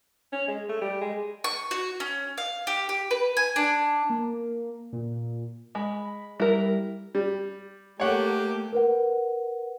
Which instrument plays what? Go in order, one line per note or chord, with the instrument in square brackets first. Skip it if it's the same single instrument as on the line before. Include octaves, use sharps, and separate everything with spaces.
[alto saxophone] C#4
G#3
A3
G3
G#3
[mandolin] C#6
F#4
C#4
F5
G4
G4
B4
G#5
D4
[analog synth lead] A#3
A#2
[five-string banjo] G#3 [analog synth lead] B5
[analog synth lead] G3 [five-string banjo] E4 A#4
[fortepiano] G3
[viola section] A3 A#3 [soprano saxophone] G4 [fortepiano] C#5 F#5
[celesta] A#4 B4 F#5